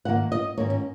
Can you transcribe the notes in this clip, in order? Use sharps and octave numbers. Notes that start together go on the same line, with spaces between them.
G#2 D#3 A#3 F#5
D#5
G#2 D#3 A#3 C#5
C#4